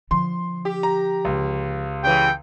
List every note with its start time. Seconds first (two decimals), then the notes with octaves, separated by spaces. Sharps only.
0.11 D3 F3 C6
0.65 G4
0.83 A#5
1.25 C#2
2.04 C#3 E3 G5